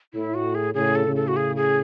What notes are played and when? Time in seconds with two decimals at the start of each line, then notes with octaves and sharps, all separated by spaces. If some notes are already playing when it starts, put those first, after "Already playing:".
0.14 A2 E4
0.34 F#4
0.55 G#4
0.74 A2 C#3 G#4
0.95 A4
1.06 A2 C#3
1.16 A4
1.28 F#4
1.36 G#4
1.56 G#4